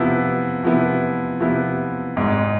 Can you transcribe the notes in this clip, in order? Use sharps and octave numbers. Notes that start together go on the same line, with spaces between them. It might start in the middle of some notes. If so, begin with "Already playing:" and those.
Already playing: C3 F3 B3 E4
C3 F3 B3 E4
C3 F3 B3 E4
G#1 G#2 G#3